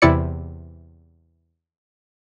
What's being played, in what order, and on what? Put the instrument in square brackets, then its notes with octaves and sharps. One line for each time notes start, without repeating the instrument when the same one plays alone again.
[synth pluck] E2 C3 E4 D5 C#7